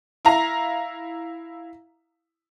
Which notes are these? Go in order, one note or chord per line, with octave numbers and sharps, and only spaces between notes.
E4 F5 A#5